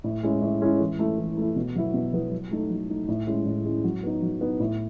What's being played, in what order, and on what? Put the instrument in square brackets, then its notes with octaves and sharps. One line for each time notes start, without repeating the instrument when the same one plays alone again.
[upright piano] A2
G#3 C#4 E4
A2
G#3 C#4 E4
E3
A3 E4
E3
A3 E4
B2
F#3 B3 E4
B2
F#3 B3 E4
F#3
A3 D#4
F#3
A3 D#4
A2
G#3 C#4 E4
A2
G#3 C#4 E4
F#3
B3 D#4
F#3
B3 D#4
A2